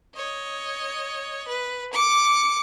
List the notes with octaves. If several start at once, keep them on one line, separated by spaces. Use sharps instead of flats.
C#5 D#5
B4
D6 C#7